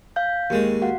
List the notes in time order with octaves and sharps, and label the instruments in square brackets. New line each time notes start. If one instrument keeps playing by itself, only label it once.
[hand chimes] F5 G6
[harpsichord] D#2 G#3 [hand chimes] G4
[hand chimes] F#4 F5 F#5